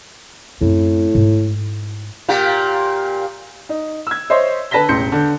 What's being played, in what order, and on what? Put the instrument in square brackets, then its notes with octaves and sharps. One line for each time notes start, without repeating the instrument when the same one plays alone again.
[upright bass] F#2 C4 [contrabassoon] A2
[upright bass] G#2
[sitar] A#2 A#3 G4
[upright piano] D#4
E6 G#6
C5 C#5 D#5 E5 C6
D3 B4 A5 A#6 B6 G7
E1 A1 C6 G6 C#7
D3